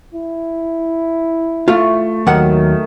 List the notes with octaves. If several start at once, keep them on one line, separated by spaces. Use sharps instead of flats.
E4
A3 F4
D#2 D#3 F#3 F#5